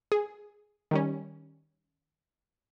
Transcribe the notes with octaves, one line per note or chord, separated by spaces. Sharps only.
G#4
D#3 G3 C#4